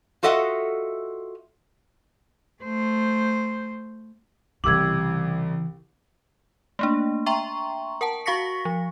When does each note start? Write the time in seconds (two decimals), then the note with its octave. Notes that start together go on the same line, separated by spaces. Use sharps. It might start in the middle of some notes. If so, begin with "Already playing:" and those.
0.23 F4 F#4 A4 D#5 E5 F#5
2.63 A3 C5
4.64 C2 C#3 E3 G4 D6 E6 G#6 F#7
6.79 A3 A#3 D4
7.26 E5 G5 A#5 C6 C#6
8.01 A#4 F#5 A5
8.26 F#4 F5 C#6 A#6 B6 C#7
8.65 F3